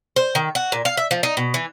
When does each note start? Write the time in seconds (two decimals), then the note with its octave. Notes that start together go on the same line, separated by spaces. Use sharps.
0.16 C5
0.35 D#3
0.55 F#4
0.72 A#2
0.85 F5
0.97 E5
1.11 F3
1.23 D#4
1.37 B2
1.54 E3